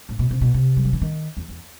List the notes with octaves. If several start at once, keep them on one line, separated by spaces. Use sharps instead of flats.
A2
B2
C3
B2
C3
G3
F#3
E3
D#3
E2
E2